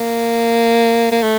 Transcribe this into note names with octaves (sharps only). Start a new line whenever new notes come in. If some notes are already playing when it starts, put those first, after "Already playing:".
Already playing: A#3
A#3
A3